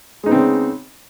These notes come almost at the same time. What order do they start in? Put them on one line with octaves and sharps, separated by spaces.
G#3 D#4 B3 C4 C#3